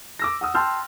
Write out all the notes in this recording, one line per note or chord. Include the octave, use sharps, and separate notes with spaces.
D6 E6 A#6
F#5 D#6 E6
G5 A5 C6 E6 F6 G6